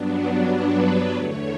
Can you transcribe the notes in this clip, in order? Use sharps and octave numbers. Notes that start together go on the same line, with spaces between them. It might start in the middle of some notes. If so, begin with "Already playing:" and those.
Already playing: G2 F#3 B3 D4
B4
E2 D3 A3 C#5